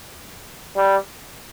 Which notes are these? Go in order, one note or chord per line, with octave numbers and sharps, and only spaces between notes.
G3